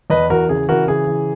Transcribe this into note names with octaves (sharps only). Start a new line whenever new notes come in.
E2 B4 D#5
E3 F#4 A#4
C#3 G#4
E3 F#4 A#4
C#3 G#4
E3